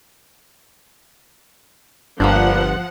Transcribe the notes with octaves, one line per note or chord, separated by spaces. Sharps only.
G1 G2 F3 A#3 B3 D4 F#5